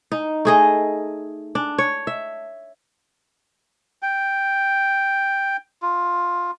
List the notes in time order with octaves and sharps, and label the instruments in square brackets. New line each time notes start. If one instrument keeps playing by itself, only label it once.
[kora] D#4
A3 G#4 D#5
D4
C#5
E5
[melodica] G5
F4